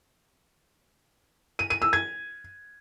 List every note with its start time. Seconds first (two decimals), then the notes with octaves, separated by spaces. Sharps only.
1.59 D#7
1.70 D#7
1.82 E6
1.93 G#6